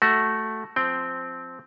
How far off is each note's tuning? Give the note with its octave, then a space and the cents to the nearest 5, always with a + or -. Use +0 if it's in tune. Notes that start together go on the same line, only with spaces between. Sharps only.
A3 +0 F#4 +10
F3 +0 C4 -5 G5 +10